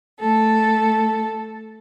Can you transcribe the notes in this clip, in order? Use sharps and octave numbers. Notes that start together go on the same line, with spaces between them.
A3 A4